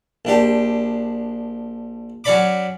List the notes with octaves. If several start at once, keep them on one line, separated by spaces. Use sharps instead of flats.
A#1 D4 G4
F#3 C#4 C#5 D5 B5 D6